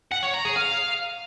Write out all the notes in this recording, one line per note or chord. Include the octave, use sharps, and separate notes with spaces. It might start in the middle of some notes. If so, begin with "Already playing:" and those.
F#5
C#5
A#5
G#4
F5